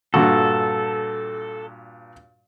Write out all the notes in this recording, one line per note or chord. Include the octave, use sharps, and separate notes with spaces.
G2 A#2 F#4 A4